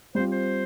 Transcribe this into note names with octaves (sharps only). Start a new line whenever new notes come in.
G3 C4 F4 C5
C5